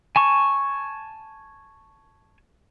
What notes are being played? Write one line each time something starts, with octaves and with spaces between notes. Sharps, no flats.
G#5 A5 C#6